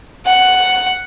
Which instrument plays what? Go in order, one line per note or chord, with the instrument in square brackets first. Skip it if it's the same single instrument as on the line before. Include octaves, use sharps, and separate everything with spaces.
[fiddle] F#5